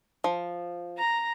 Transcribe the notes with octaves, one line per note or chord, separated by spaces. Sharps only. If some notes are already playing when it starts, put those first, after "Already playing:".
F3
A#5 A#6